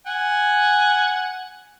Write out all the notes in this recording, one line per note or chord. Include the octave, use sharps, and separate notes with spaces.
F#5 G#5